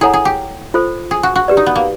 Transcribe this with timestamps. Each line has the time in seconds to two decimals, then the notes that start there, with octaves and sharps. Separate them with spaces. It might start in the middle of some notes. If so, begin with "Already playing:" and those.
0.01 E4 G#4 A4 C#5 F#5 A#5
0.13 G#4
0.25 G4
0.74 F4 A4 C5
1.11 G#4
1.23 F#4
1.36 F#4
1.48 G4 B4 D5
1.57 D#4
1.66 B3
1.76 A#3